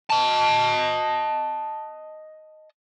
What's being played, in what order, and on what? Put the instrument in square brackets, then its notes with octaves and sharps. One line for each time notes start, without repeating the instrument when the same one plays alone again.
[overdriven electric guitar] D#5 A5